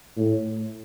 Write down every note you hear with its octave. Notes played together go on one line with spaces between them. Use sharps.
A2